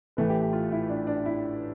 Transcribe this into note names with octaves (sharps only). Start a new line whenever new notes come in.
A1 A2 E3 A3 B4
G4
G4
F4
E4
D4
D4
E4